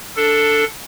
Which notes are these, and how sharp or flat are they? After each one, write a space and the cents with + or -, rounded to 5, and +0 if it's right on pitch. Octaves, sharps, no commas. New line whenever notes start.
D4 +0 A4 +10